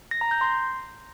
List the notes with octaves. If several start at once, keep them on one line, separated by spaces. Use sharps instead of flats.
A#6
A#5
G6
C6